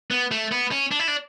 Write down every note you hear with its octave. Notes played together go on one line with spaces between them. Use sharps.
B3
A3
B3
C#4
D4
E4
D4